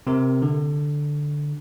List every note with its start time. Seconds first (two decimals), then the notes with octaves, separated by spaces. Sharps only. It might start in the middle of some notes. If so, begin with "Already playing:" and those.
0.07 C3 A#4
0.42 D3